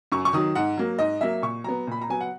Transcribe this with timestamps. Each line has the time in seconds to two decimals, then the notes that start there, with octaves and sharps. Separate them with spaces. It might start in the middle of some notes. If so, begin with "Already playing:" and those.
0.12 F#2 C#6
0.25 C#6
0.33 D#3 F#3 D#6
0.55 G#2 F#5
0.77 F#3 A#3
0.99 G#2 D#5
1.21 F#3 A#3 E5
1.42 A#2 C#6
1.64 F#3 B3 A#5
1.87 A#2 B5
2.01 A#5
2.09 F#3 B3 G#5
2.21 F#5